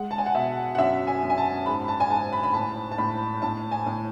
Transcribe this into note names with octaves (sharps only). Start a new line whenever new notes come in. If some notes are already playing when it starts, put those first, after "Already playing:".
Already playing: G#3 F#5
A5
G#5
F#5
B2 E5
F#5
F#2 E5
G#5
F#2
G#5
A5
G#2 B5
A5
G#5
G#2 A5
B5
B5
A2 A5
A5
A2 B5
A2 A5
G#5
A2